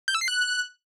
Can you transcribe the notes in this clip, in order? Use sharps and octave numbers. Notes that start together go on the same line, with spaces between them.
G6
E6
C7
F#6